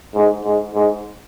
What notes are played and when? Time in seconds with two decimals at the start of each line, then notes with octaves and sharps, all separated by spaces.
0.14 G#2
0.44 G#2
0.74 G#2